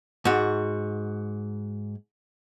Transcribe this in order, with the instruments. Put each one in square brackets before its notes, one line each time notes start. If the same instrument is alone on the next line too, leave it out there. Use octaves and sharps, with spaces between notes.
[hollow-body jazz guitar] G#2 F#4